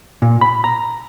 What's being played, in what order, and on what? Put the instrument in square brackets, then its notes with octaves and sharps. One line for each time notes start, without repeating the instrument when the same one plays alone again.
[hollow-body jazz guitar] A#2
B5
A#5